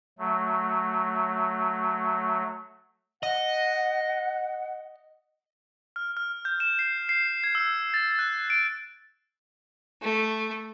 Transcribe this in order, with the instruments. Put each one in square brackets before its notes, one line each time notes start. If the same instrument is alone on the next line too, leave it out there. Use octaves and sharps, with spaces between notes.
[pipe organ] F#3 A3
[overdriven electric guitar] D#5 [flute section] F#5
[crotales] F6
F6
G6
E7
C7
C7
G#6
E6
A6
F#6
D7
[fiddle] A3